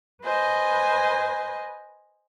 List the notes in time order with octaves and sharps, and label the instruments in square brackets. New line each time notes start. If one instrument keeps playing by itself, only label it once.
[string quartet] B4 C5 D#5 G#5